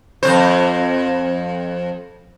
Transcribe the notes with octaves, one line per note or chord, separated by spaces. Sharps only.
F2 D#3 C5